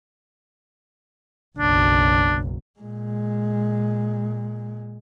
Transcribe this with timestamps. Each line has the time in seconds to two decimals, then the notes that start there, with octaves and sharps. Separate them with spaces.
1.59 F#1 B1 D4
2.79 A#2 G#3